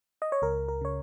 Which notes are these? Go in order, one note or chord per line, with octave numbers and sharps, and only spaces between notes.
D#5
C#5
C#2 A#4
A#4
C#3 C#5